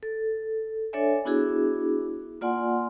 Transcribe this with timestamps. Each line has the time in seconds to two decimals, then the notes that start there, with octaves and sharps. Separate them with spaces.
0.03 A4
0.93 D4 A4 C#5 D5 E5 G#5
1.25 B3 D4 E4 F#4 G#4
2.41 A#3 F4 D5 F#5 G#5 C6